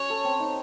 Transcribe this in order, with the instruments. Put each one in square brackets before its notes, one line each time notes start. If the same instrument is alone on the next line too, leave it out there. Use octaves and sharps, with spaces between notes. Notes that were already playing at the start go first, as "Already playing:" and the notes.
Already playing: [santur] C#4 F#4 [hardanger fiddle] C#5
[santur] A4
C4
D#4